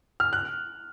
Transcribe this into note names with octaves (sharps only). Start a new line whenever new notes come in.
F6
F#6